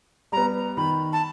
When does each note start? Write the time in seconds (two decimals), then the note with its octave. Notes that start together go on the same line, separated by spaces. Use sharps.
0.32 G3 B3 A#5
0.77 D#3 B5
1.13 A5